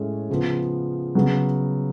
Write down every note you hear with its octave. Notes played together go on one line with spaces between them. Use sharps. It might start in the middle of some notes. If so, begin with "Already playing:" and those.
Already playing: A2 G#3 C#4 G#4
C#3 F3 B3
C#3 F#3 B3